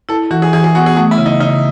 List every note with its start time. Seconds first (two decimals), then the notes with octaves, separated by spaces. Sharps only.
0.09 E4 A4
0.31 E3 F#4
0.42 G#4
0.53 E3 G#4
0.64 G#4
0.75 B3 F#4
0.86 G#4
0.96 A3 F#4
1.11 E4
1.18 C#3
1.26 D#4
1.40 C#3 D#4